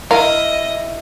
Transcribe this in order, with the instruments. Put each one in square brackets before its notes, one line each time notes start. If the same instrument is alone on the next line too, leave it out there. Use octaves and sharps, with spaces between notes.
[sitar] E4 [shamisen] A#4 [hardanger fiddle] D#5 [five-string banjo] F5